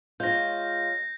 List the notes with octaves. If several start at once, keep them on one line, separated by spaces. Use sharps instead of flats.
G#3 F4 C#5 G6 A#6